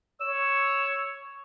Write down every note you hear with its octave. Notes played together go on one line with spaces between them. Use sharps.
C#5 E6